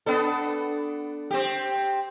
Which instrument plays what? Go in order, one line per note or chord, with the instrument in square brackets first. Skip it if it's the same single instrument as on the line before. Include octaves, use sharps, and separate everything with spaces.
[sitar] B3 D4 A4
C4 G4